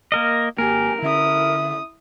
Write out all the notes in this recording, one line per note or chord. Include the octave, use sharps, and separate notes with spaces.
A#3 A#4 D#5
G#1 A#3 G4 A#4 G#5
D3 C#4 E4 E5 D#6